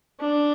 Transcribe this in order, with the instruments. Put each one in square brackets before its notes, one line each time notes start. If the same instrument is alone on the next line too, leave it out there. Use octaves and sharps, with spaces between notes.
[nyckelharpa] D4